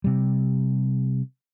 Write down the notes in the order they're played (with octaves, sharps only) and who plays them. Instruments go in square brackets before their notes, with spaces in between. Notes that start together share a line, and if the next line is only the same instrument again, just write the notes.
[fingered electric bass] C3 G3